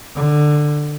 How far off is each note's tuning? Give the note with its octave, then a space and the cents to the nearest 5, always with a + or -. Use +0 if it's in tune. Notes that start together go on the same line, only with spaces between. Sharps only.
D3 +15